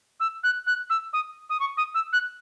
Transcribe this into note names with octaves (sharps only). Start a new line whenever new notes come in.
E6
F#6
F#6
E6
D#6
D#6
C#6
D#6
E6
F#6